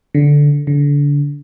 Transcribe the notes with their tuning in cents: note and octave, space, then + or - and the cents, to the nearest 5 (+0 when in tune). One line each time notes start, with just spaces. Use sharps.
D3 -10
D3 -30